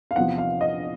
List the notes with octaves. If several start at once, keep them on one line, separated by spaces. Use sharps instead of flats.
F5
E2 C3 F3 F#5
F5
D#5